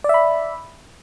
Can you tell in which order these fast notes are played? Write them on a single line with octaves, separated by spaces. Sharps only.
D5 E5 B5